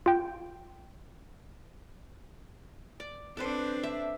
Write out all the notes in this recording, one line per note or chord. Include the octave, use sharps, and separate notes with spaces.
F4 G5
D5
C4 D4 A4 B4 C5
E5